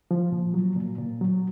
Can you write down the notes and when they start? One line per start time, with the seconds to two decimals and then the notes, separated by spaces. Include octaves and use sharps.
0.11 F3
0.32 A#2
0.54 F#3
0.76 A#2
0.98 A#2
1.21 F#3